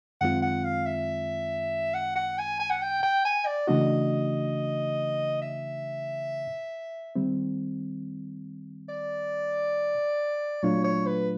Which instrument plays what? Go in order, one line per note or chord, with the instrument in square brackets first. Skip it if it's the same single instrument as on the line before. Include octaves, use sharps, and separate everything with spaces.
[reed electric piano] F#2 D#3 G#3 C4 F4 [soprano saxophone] F#5
[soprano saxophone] F#5
F5
E5
F#5
F#5
G#5
G#5
F#5
G5
G5
G#5
D5
[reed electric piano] C#3 E3 A3 D4 F#4 [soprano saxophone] D#5
[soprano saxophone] E5
[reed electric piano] D#3 G3 C4
[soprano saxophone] D5
[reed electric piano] A#2 F#3 A3 D4 F4 [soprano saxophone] C#5
[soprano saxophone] C#5
B4